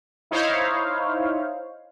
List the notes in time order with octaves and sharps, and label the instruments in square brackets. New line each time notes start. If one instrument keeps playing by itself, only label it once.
[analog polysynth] D#4 E4 C5 C#5 F5